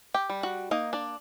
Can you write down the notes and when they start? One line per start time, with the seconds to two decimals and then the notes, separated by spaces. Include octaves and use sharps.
0.14 G4 G5
0.30 G3
0.43 F#4 F#5
0.71 A#3 D#4 D#5
0.93 D4 D5